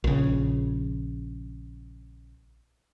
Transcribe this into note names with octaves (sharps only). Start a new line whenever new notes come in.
A#1 C#3